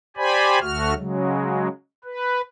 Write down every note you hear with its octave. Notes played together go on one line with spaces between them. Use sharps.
G4 C5 D5 G#5 B5
D2 A3 F#4 F6
C#3 F#3 G#3
B4